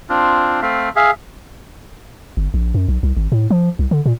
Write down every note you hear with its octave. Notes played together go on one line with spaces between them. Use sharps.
C4 D4 F4
A3 C4 E5 F5
G#4 E5 F5
G1
A#1
F#2
B1
C2
G#1
A2
F3
C2
D3
A#2